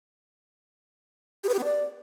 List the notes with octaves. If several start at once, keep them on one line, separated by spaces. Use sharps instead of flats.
G4
B4
G4
B3
D5